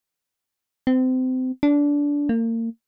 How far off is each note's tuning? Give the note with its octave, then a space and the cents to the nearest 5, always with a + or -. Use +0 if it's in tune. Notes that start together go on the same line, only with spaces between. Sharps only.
C4 -30
D4 -20
A#3 -35